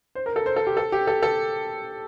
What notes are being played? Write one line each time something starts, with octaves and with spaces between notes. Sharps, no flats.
C5
A#4
A4
C5
A4
G4
A4
G4
A4
A4